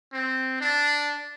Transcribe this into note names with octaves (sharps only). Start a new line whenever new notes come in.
C4
D4